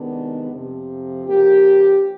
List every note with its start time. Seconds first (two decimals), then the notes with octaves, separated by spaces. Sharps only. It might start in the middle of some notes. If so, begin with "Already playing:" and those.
Already playing: C3 D#3 G#3 B3 D4
0.52 F2 C3 F3
1.25 C#3 F3 A#3 D4 G4